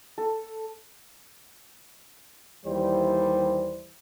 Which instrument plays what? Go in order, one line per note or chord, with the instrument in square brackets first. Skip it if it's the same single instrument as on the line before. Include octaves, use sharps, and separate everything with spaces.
[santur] A4
[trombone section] D#2 E3 G3 E4 C5